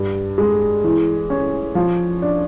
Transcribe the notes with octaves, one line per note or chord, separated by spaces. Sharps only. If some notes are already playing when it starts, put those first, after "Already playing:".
Already playing: G2
G#3
E3
C#4
F3
D4